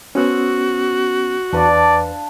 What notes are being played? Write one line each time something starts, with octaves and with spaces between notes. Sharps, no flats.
B3 C#4 F#4 C5 D#6 E6
E2 D4 B4 D5 F5 A5